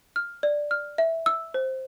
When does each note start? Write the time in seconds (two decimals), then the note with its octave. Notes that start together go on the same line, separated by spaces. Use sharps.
0.16 F6
0.43 D5
0.71 F6
0.98 E5
1.26 E6
1.54 C5